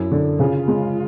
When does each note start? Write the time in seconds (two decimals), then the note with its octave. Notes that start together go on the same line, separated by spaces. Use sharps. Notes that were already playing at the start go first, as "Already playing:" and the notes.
Already playing: F#2 E4
0.12 D3
0.39 C#3 F4
0.68 G#3